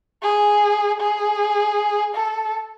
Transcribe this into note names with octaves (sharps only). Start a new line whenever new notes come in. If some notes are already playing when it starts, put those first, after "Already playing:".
G#4
G#4
A4